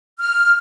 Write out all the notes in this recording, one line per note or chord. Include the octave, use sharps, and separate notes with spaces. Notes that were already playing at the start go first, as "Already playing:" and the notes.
F6